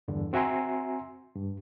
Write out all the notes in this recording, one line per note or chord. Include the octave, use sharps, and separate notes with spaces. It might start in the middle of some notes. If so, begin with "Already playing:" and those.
E2 G2 D3
C4 F#4 E5 G#5 A#5 C6
G2